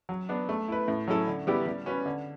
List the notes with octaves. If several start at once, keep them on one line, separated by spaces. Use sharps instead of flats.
F#3
B3 D4
A3
E4 B4
A2
F#3 C#4 E4 A4
D3
G3 B3 E4 G4
G3
C#4 F#4 B4
D3